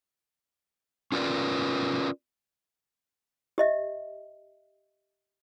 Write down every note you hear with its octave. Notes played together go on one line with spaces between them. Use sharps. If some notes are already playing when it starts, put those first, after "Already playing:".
C#4 F4 A#4 B4 D5
G4 D#5 E5